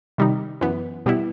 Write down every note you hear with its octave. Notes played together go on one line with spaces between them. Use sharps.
C3 D#3 G3 D#4
F#2 E3 B3
B2 G3 B3 E4